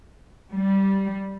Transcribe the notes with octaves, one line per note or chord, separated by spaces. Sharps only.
G3